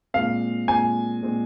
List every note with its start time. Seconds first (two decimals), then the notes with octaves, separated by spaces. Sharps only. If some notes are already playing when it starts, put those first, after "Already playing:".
0.14 A#2 G#3 C4 F5
0.68 A#2 G#3 C4 G#5
1.22 A#2 G#3 C4